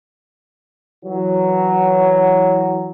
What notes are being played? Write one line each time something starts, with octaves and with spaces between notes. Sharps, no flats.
E3 F#3